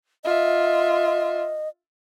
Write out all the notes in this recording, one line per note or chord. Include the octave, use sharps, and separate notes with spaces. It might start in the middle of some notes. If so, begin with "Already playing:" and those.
F4 D#5 E5